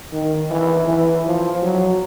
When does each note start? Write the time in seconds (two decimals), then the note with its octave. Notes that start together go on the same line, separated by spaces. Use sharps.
0.12 D#3
0.50 E3
0.87 E3
1.25 F3
1.62 F#3